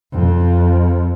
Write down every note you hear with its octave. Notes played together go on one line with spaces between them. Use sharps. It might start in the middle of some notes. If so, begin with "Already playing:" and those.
F2